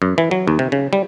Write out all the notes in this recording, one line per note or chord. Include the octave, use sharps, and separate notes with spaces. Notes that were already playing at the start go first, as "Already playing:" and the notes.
F#2
E3
F#3
D#2
C3
C#3
G3